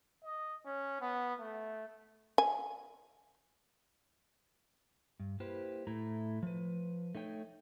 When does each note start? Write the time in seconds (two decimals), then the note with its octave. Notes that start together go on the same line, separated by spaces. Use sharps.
0.24 D#5
0.66 C#4
1.02 B3
1.40 A3
2.38 G#5
5.20 G2
5.40 A#3 E4 G4 B4 C5
5.87 A2 A3 E4 A#5
6.43 F3 B4
7.15 A3 D#4 C#5 G5